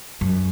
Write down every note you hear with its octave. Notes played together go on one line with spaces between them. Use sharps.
F#2